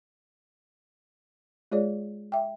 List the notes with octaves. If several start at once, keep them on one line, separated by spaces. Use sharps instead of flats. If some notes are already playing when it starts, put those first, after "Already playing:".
G#3 F4 G#4 C#5 D5
E5 G5